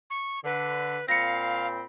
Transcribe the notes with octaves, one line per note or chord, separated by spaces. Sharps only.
C#6
D3 B4
A#2 C4 F5 B5 A#6 C#7